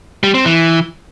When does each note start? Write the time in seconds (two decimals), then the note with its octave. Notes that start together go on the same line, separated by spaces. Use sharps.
0.23 G3
0.34 C4
0.45 E3